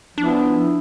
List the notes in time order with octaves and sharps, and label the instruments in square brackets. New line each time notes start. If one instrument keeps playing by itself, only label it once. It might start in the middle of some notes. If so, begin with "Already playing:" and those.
[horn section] F3 B3 E4 [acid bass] D4